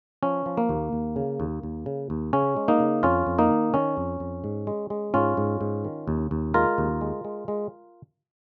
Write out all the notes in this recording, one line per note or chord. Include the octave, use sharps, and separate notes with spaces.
F3 C#4
F3
A#3
D#2
D#2
C#3
D#2
D#2
C#3
D#2
C#3 C#4
G#3
A#3 D#4
C#3
F2 C#4 F4
F2
A#3 D#4
D#3
D#3 C#4
F2
F2
G#2
G#3
G#3
G#2 C#4 F4
G#2
G#2
D#3
D#2
D#2
G#3 F4 A#4
D#2
G#3
G#3
G#3